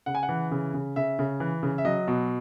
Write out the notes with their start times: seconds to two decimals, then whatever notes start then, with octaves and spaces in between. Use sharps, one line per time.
0.06 C#3 F#5
0.15 G#5
0.23 F#5
0.29 E3
0.51 C#3
0.74 C#3
0.96 C#3 E5
1.19 C#3
1.40 E3
1.63 C#3
1.78 E5
1.85 F#3 D#5
2.08 B2